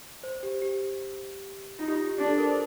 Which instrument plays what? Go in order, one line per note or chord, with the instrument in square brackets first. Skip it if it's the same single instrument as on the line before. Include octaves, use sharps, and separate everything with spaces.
[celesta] C5
G4
G4
[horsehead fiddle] D#4 [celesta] F4
[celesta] G4
F4
G4
[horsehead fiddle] D4 [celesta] G4
[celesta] A4
A#4
C5